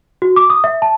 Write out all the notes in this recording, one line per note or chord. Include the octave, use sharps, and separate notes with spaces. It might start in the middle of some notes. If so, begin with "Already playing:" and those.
F#4
D6
D#6
E5
A5